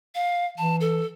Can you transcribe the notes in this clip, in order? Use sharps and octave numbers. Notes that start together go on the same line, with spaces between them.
F5
E3 A5
A4